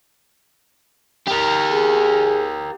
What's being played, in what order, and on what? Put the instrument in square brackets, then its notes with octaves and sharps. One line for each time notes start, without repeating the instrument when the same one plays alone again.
[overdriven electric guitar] G4 A#4
[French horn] G#4